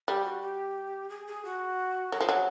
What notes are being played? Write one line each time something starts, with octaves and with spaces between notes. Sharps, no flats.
G3 G4
F#4
G4
G#4
G#4
F#4
F#3 A#4
F3 G#4
F#3